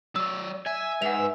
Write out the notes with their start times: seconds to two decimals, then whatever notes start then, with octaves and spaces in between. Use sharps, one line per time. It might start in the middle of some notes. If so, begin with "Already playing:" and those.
0.16 F#3 D5 E6
0.66 E5 G#5
1.02 G#2 B4 E5 F#5 G#5 F7